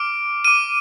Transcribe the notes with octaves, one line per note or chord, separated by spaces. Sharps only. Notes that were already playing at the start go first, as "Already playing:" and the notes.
Already playing: D6 F6 D7
D6 F6 D#7